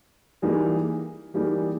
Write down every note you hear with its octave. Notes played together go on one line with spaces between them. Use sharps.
E3 G3 A#3 D#4 G#4
E3 G3 A#3 D#4 G#4